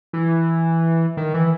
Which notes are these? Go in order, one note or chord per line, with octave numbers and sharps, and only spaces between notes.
E3
D#3
E3